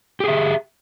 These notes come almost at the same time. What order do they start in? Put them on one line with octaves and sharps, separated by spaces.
G4 G#4 E5